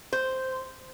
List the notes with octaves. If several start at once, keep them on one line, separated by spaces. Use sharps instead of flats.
C5